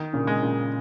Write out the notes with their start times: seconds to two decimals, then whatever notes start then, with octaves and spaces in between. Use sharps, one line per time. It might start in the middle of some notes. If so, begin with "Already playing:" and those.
Already playing: D#3
0.13 A#2 C#3
0.27 G#3
0.42 A#2 C#3